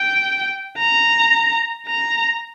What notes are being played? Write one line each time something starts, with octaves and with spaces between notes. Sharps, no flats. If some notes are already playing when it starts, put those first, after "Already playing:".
Already playing: G5
A#5
A#5